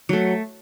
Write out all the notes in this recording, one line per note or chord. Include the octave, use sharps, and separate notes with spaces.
F#3 A3